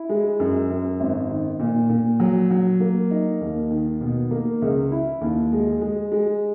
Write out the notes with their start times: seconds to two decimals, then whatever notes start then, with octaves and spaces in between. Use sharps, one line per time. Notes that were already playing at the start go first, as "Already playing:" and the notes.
Already playing: E4
0.09 G#3
0.40 F#2
0.70 F#2
1.00 G#1
1.30 D#3
1.60 A#2
1.89 A#2
2.20 F#3
2.51 F#3
2.80 A#3
3.11 D#4
3.41 D#2
3.70 D#3
4.01 B2
4.31 A#3
4.62 C#2
4.91 E4
5.21 D#2
5.52 G#3
5.82 G#3
6.12 G#3